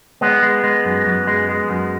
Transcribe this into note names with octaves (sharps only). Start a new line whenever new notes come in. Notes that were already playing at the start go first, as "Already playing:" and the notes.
G#3 B3
G#3
G#3
F#2
F#2
G#3
G#3
F#2